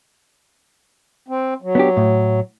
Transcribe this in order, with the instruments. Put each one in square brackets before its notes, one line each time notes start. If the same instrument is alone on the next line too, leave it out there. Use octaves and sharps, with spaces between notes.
[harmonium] C4
F#3
[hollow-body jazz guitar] B3 D4 G4
A2